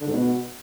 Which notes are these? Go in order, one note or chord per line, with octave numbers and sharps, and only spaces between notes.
D3
G#2
B2